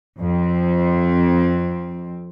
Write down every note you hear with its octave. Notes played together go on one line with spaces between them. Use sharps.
F2 C4